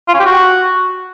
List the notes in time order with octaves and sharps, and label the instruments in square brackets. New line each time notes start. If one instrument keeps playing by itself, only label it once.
[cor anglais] F4
C#4
G4
F#4